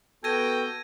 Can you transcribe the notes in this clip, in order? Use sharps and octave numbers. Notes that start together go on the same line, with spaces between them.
B3 F#4 A4 G5 G#6 A#6 D#7